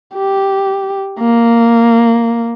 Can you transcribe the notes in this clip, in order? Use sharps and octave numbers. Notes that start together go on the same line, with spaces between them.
G4
A#3